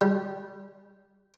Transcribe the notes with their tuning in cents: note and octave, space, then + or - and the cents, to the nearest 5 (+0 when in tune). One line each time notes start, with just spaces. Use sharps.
G3 -15